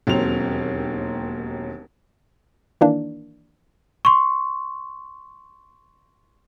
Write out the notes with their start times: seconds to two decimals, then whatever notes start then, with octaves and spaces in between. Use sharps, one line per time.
0.07 E1 D#2 F#3 C4 F7
2.81 D#3 E3 A#3 D4
4.05 C6 C#6